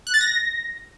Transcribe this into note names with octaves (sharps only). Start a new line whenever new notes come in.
F#6
A6
A#6